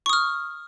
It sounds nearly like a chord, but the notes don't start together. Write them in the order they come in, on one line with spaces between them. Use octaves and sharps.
C#6 D#6 F6